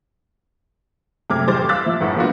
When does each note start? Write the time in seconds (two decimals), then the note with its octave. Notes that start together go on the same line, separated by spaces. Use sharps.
1.30 F#2 C3 A3 D6 F6 G#6
1.47 E2 A2 G3 C5 D6 A6
1.69 F5 D6 E6 F#6 A6 B6
1.86 F3 E4
2.01 G1 A2 F#5
2.16 F3 A#3 B3 D4 F4 F#4